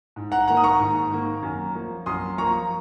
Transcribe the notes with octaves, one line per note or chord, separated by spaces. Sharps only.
G#2
F#5 A#5
D#3 A#3 F#5 A#5
D#6
A#5 C#6
G#2
D#3 A#3
F#2
F3 A#3
F#2 C6 D#6
F3 A#3 A#5 C#6